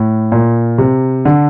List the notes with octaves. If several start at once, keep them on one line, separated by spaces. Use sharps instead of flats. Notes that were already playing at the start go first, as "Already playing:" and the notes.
Already playing: A2
A#2
C3
D3